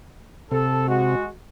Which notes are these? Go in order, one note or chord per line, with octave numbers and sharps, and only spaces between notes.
C3 A4
G#3 F#4